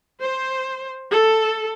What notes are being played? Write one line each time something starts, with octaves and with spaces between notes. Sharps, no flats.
C5
A4